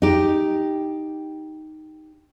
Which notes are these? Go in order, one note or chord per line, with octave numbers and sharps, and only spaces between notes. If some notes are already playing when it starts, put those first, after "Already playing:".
D#4 G4